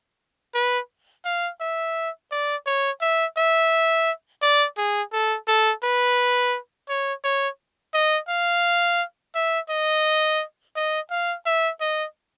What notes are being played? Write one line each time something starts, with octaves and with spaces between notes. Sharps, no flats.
B4
F5
E5
D5
C#5
E5
E5
D5
G#4
A4
A4
B4
C#5
C#5
D#5
F5
E5
D#5
D#5
F5
E5
D#5